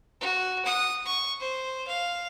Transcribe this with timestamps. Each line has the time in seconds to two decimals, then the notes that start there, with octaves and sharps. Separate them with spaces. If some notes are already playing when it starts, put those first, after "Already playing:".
0.21 F#4
0.66 F#5 D#6
1.05 C#6
1.41 C5
1.88 F5